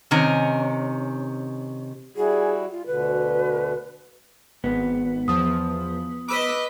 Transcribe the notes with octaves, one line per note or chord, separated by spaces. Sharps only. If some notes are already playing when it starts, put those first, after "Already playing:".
C3 D#3 C#4 A#4 G#5
G3 E4 F#4 G#4
F4
D2 B2 D3 B4
G#1 B3
E2 F3 D#6
B4 D#5 D6 E6 B6